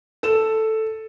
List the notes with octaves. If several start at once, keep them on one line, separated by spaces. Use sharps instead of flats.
A4 E7